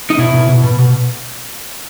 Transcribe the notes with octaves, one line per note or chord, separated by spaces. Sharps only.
D#4
B2 E4
B2
B2
B2
B2